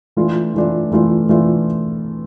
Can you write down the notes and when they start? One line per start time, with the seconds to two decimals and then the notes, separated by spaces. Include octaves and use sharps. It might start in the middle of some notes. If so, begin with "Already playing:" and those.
0.17 E3 A3 D4 F4
0.54 E3 A3 D4 F4
0.91 E3 A3 D4 F4
1.29 E3 A3 D4 F4